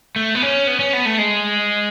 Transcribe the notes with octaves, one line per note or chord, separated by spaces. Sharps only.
A3
B3
C#4
B3
C#4
B3
A3
G#3